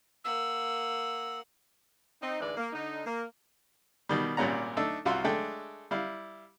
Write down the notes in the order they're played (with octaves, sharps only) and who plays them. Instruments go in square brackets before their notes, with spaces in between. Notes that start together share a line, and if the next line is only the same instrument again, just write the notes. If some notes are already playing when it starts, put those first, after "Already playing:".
[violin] A#3 F#5 [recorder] E6
[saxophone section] C4 D#4
D2 G#2 E3 G#3 B4 D5
A#3
D3 D#4
A#3
[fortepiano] B2 D#3 G3
G#1 A#2 G3 C#4 F#5 A#5
A3 D4 D#4 A4 E5
C2 F4 F#4 E5 C6
G#3 A3 D4 A4 G5
G3 E4 F5